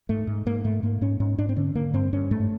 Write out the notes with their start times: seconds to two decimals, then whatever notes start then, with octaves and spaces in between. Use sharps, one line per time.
0.09 G#2 A3
0.27 G#2
0.46 G#2 A#3
0.64 G#2 A3
0.83 G#2 A#3
1.01 G#2 C#4
1.20 G#2 C#4
1.38 G#2 D4
1.49 C4
1.56 D3 C#4
1.75 D3 A#3
1.94 G2 C4
2.13 G2 C#4
2.31 G#2 A3